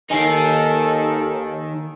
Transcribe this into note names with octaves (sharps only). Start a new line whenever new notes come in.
D#2 D#3 D#4 A4 G#5 C7